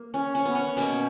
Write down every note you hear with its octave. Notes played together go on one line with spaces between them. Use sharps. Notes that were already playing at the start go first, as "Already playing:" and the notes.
Already playing: A#3
C#4
C#4
B3
C#4
B2 A#3 C#4